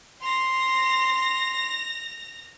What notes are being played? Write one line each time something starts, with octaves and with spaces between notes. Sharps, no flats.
C6 A#6 F7